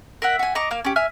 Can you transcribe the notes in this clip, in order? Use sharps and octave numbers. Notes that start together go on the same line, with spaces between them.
A#4 E5 F#5
F#4 G#5
D#5 A#5 C#6 D6
A#3 F5
C#4 G4
E5 G#5 F6